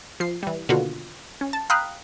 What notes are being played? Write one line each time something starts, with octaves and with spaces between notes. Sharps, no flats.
F3 C7
E3 G3
B2 D3 D#3 A#3 F4 F#4
C#4
A5
F5 G5 A#5 B5 D#6 F#6